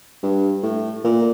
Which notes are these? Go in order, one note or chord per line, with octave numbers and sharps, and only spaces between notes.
G2
A2
A#2